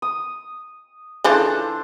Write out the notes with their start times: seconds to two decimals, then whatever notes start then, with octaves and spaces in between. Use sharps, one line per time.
0.02 D#6
1.24 C#3 E3 D4 F4 A4 C5